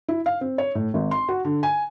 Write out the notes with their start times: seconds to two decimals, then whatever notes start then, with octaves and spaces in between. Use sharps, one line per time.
0.08 E4
0.26 F5
0.41 C4
0.58 C#5
0.75 A2
0.94 G#1
1.11 C6
1.29 F#4
1.45 D3
1.63 G#5